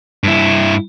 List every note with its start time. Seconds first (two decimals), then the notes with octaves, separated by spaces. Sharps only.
0.24 G2 E4